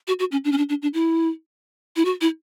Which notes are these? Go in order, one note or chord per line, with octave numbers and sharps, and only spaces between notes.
F#4
F#4
C#4
D4
C#4
D4
D4
D4
E4
E4
F#4
E4